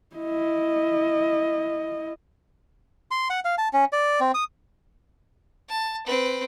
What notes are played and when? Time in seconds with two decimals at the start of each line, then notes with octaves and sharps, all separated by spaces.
0.16 E4 D#5
3.11 C6
3.30 F#5
3.45 F5
3.58 A5
3.73 C#4
3.93 D5
4.20 C4
4.34 D#6
5.69 A5
6.06 C4 B4